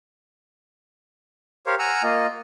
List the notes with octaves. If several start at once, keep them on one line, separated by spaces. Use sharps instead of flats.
G4 A#4 C5 C#5 F5
F#5 G#5 A#5 E6 F6
A#3 F4 D#5